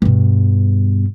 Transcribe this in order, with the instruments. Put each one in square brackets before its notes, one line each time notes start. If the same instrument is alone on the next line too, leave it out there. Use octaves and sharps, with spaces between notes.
[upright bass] G2 B2